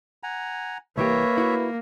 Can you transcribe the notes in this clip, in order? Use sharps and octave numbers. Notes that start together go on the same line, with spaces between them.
F#5 G#5 A#5
C2 E3 A#3 G4 B4 C#5 E5
E4 F#4